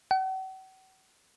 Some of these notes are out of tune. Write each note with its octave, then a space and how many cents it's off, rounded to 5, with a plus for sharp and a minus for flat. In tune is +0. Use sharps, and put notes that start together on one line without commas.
F#5 +45